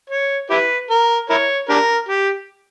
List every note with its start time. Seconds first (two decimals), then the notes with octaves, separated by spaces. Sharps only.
0.10 C#5
0.50 E4 G4 B4
0.90 A#4
1.30 E4 A#4 C#5
1.69 D4 G4 A#4
2.09 G4